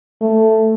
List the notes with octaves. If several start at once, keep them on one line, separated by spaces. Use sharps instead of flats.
A3